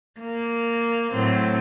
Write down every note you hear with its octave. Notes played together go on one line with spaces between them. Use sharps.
A#3
A2 F#3 C4